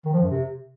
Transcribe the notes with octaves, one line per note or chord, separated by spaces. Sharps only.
D#3
F3
F#2
C3